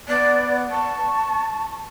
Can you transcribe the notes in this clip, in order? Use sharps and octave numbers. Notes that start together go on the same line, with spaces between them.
B3 D5
A5 C#6